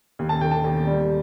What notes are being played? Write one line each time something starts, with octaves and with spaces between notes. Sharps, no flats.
D#2
A5
D#2 G5
A5
D#2
G3